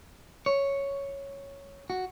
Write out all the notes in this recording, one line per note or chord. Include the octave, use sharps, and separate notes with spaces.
C#5
F#4